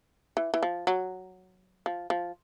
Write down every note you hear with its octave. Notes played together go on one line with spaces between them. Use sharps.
E3
E3
F3
F#3
F3
F3